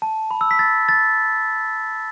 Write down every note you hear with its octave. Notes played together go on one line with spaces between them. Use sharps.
A5
B5
E6
B6
A6
A6